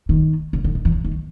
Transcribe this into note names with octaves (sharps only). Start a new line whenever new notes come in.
D#3
C#3
D3
D#3
E3
D#3